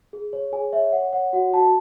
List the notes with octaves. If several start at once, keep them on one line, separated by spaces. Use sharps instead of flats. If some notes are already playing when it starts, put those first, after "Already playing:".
G#4
C#5
G#4 G#5
C#5 E5
C#5 F#5
C#5 F#5
F#4 F#5
F#4 A5